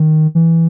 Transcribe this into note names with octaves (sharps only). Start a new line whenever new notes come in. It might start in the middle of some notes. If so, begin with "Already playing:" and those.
Already playing: D#3
E3